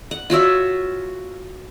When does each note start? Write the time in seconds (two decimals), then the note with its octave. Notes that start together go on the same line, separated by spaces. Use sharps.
0.11 F#5
0.30 F4 F#4 C#5 E5